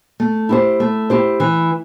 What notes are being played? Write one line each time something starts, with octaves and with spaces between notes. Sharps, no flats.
A3
E4 G4 C5
A3
E4 G4 C5
E3